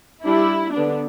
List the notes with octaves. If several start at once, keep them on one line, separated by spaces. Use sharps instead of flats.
G3 D4 E4
D3 B3 D4